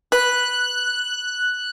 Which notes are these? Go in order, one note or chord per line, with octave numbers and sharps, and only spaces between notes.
B4 F#6